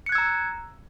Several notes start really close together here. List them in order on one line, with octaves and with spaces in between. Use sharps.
C#7 F#6 G#6 E6 A#5